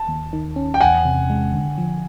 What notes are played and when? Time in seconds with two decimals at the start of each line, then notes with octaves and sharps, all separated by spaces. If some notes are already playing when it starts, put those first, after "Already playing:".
Already playing: A5
0.08 D#2
0.33 D#3
0.56 C#4
0.74 G5
0.81 E2 F#5 G#5
1.05 C3
1.30 G#3
1.54 D3
1.78 F3